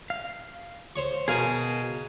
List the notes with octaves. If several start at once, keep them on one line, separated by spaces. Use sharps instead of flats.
F5
C5 C#5 C#6
B2 G#4 A#4 F5 G#5